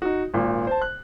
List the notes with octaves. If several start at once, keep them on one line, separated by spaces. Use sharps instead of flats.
D#4 F#4
G#1 A#2
C5 A5
F#6